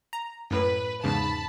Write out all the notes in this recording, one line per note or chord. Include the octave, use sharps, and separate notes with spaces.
A#5
F#2 A2 B4
E2 G#2 C#3 A5 B5